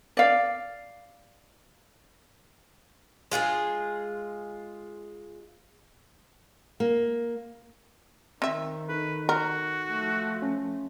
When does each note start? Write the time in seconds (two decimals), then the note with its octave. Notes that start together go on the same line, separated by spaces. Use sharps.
0.17 D5 F5
3.32 G#3 F4 G4 G#4
6.80 A#3
8.42 D#3 C4 E5
8.89 D#4 A4 B4
9.29 F#4 A#4
9.89 F3 A3
10.42 C#4